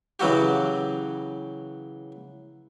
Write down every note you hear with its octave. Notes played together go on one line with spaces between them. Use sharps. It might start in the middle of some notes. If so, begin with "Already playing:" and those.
C#3 E3 F#3 F#4 G4